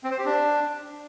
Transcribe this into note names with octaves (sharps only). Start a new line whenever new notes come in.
C4
C5
G4
D4